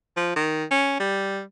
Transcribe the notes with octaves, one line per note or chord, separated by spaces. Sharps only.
F3
D#3
C#4
G3